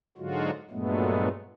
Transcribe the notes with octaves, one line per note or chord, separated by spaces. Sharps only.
G#2 D3 F#3 G#3 F4 F#4
G2 A#2 F#3 G#3 A3 B3